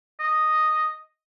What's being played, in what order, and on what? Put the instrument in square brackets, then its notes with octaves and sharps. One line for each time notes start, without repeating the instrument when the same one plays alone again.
[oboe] D#5